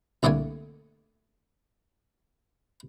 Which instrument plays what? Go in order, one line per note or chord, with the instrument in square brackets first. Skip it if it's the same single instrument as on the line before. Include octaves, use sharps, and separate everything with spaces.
[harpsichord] C2 D3 A3 A#3 G#5